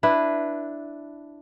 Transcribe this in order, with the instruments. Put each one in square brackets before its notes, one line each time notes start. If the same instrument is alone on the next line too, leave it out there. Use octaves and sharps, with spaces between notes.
[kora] D4 E4 B4